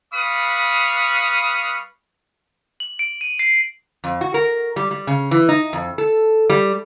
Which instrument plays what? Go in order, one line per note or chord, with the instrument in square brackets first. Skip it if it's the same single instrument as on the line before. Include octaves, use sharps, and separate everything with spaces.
[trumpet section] G3 B4 F5 B5 C#6 D#6
[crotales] F#7
D7
D#7
C7
[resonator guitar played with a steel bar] F2
F#4
A#4
G3
G3
C#3
E3
D#4
F2
A4
G3